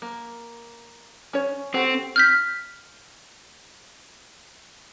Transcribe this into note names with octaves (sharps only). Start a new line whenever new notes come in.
A#3
C#4 C#5
C4 F#4 G4 A4 C5
F6 G6 B6